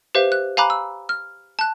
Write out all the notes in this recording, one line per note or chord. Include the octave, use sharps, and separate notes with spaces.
G4 B4 C5 E5 F5
F#6
F5 G#5 A#5 B5 D6 F#6
E6
F6
A5 F#6